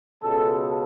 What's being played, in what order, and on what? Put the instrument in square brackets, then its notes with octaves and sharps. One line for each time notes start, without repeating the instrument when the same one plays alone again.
[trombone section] C#2 B2 G#3 A4